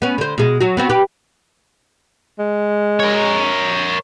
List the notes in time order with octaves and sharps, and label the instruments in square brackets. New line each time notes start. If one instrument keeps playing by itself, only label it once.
[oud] B3 C#4
D3 C5
B2 G#3
F#3 F#4
B3 C4 F#4
G4 B4
[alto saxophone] G#3
[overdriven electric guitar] A#4 C#5